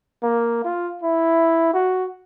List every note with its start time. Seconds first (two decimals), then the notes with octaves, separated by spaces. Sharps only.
0.23 A#3
0.64 F4
1.03 E4
1.74 F#4